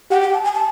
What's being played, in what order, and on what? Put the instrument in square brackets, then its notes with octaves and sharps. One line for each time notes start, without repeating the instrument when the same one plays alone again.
[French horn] G4 [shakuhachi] F#5
[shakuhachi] G5
A5
G#5
A5